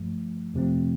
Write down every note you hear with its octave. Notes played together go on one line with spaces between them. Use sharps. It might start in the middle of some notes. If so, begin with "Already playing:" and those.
Already playing: G2 F3 A3
F2 C3 F3 A3 C4